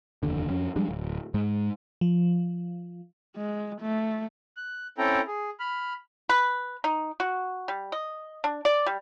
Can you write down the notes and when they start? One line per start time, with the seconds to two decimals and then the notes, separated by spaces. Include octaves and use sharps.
0.23 F1 D#2 D3
0.50 F2 C#4
0.76 F3 G3 G#3 D4
0.89 D1
1.34 G#2 G#3
2.01 F3
3.36 G#3
3.81 A3
4.57 F#6
4.98 C4 C#4 E4 A4 G5 A#5
5.27 G#4
5.60 B5 F6
6.29 B4
6.84 D#4
7.20 F#4
7.68 G3
7.92 D#5
8.44 D4
8.65 D5
8.86 G3